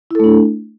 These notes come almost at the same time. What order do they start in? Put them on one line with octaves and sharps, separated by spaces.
E4 A4 A3 D4